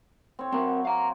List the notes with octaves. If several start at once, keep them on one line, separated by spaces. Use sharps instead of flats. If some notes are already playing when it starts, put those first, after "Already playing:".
C4 C#5
F#3 C4 A#4
F5 A#5